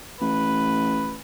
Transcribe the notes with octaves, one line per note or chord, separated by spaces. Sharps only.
A1 B4